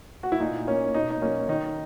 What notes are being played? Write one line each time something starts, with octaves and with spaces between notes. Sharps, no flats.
F#4
E4
A#2 D#4
A#3 C#4
B2 D#4
D#4
F#3 A#3 C#4
D#3 D#4